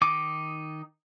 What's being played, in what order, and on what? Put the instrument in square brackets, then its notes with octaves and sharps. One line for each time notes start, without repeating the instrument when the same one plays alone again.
[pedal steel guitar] D#3 D#4 D6